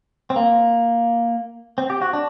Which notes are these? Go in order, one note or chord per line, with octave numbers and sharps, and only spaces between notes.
C4
A#3
C4
G4
F#4
D4